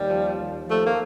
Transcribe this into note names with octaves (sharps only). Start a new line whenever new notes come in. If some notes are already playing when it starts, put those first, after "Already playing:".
Already playing: D#2 G3
F3
D#2
F3 A3
A#3